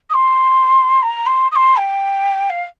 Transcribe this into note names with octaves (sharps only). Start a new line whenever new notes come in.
D#6
C6
A#5
C6
D#6
C6
G5
F5